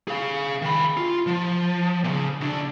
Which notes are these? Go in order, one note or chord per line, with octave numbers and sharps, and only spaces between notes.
G#4 F5
D#3 B5
F4
F3
A#2 C#3
D2 D4